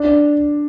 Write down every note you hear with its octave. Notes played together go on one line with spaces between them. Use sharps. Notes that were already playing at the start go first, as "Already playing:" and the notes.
Already playing: D4